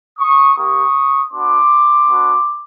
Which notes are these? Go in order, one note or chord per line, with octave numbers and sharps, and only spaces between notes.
C#6 D#6
A#3 D#4 G4 C#6 D#6
B3 D4 F#4 C6 D6
B3 D4 F#4